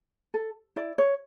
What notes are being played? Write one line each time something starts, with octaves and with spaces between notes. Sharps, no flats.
A4
E4 D5
C#5